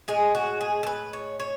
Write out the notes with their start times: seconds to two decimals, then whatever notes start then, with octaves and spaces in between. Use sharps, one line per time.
0.08 A2 G#3 G#4
0.35 F#4
0.61 G#4
0.83 A4
0.87 B4
1.13 C#5
1.40 C#5